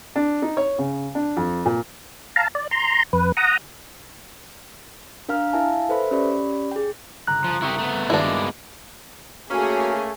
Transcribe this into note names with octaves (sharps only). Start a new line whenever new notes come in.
D4
D#4
C#5
C#3
D4
F2
A#2
F5 A5 A#5
D5
A#5 C6
F2 B4
F#5 A#5 D#6
D4 A#4 F5 A#5 F6
E4 A#4 E5 F5 G#5 A5
A4 B4 C5 E5 B5
C#4 G4 D5 B5
G#4 G5
G1 C#3 A#5 F#6
F3
C4 E4 G4 A#4 C#6 D#6
A3 B3
G2 D#3 G#3 A#3 B3 D4 E4 F#4
A3 A#3 C#4 F#4 G#4